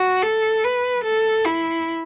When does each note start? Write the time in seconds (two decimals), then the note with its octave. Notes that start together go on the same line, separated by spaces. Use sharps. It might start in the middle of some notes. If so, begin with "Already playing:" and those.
Already playing: F#4
0.23 A4
0.64 B4
1.04 A4
1.45 E4